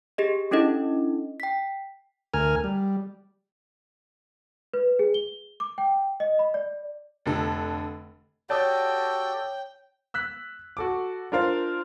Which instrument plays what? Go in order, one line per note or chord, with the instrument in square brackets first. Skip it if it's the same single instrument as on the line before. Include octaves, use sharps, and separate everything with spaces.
[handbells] G4 G#4 D#5
C#4 D4 E4 A4 D#5
G5 B6
[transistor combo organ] D2 A#4 G#5 F6
G3
[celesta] B4
G#4
G7
D6
G5
D#5
B5
D5
[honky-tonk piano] F1 D3 A4
[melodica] F#4 G4 A4 [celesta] C#5 [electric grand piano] D5 A5 D#6 [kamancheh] G5
[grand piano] E6 F#6 B6
F#4 A4 D6
D4 F4 A#4 C5 F5